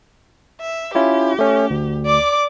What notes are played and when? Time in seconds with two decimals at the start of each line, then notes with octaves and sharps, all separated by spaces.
0.61 E5
0.95 C#4 E4 F4 G4
1.39 A3 C#4
1.70 D2
2.06 D5 D6